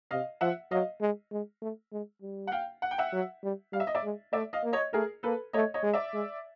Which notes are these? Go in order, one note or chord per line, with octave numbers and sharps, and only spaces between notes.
C3 D#5 F5
F3 E5 F#5
F#3 D#5 F5
G#3
G#3
A3
G#3
G3
F#5
F5 G5
F#5
G5
E5 F#5
F#3
G3
G3 F5
E5
D#5
D5 E5
G#3
A3 D5 E5
D#5 F5
A#3
C#5 D#5
A3 G#4 A#4
A#3 A4 B4
A3 C#5 D#5
C#5 D#5
G#3
D5 E5
G#3